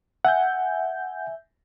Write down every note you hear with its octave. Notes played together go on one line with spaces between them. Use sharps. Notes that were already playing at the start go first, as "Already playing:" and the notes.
E5 F#5 G#5 G6